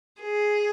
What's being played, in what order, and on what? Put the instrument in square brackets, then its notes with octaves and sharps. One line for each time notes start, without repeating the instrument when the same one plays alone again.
[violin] G#4